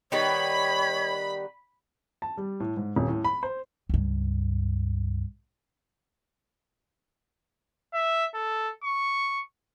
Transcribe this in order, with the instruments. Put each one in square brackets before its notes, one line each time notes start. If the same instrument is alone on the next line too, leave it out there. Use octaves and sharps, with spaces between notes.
[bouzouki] D#3 G3 B3 [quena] C#5 [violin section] B5
[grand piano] A5
G3
A2
G#2
D#1
A2
B5
C5
[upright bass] C#2 G2
[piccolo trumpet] E5
A4
C#6